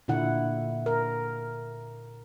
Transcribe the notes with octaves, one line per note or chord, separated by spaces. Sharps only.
A#2 D3 E4 F#5
A#4